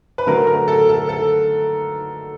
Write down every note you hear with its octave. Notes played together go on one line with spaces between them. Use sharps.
B4
D3 F#3 A3 A#4
A#4
A4
A4
A4